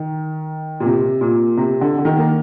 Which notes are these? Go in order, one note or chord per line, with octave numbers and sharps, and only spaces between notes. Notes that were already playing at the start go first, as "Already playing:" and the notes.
Already playing: D#3
A#2
C3
A#2
C3
D3
D3
D#3
A#3